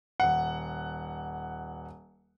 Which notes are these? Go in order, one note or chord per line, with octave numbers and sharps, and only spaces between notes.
D#1 F#5